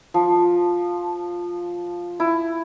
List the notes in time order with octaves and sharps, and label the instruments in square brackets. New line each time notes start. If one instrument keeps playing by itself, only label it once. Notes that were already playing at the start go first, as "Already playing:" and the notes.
[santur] F3
E4